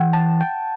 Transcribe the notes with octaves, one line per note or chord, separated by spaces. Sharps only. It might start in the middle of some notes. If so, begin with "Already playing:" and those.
Already playing: E3 F#5 G5
A5
G5